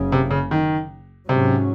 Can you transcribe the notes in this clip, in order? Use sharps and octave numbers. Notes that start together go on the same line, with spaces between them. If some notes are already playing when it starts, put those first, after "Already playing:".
Already playing: F#1 F#2 C#3
C3
C#3
D#3
G#2 C3 F#3 C#4